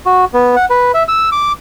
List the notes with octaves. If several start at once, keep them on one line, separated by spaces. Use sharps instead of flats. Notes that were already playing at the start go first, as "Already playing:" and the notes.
F#4
B3
F#5
B4
E5
E6
D6